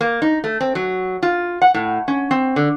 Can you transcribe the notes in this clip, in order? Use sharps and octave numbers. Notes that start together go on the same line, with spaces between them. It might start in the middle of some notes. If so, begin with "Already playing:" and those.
A#3
D#4
A3
C4
F#3
F4
F#5
A2
C#4
C4
D3